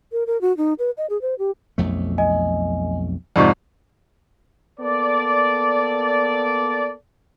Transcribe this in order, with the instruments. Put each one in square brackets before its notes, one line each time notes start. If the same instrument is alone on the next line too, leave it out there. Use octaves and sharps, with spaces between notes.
[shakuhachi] A#4
A#4
F#4
D#4
B4
D#5
G#4
C5
G4
[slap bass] B1 F2 A3
[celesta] D#5 G#5
[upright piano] F2 G#2 C3 [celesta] D5 D#5 C#6
[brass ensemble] A#3 B3 A4 D5